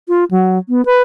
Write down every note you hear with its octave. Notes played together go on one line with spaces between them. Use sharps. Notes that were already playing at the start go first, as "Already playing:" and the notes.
F4
F#3
B3
B4